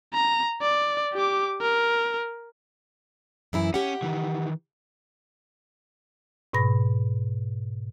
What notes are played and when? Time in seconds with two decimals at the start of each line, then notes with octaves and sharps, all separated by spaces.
0.13 A#5
0.62 D5
1.13 G4 D6
1.61 A#4
3.53 F#2 E3 E4
3.74 C#4 G4 F#5
4.02 D#3 E3
6.53 G#2 B2 B5 A#6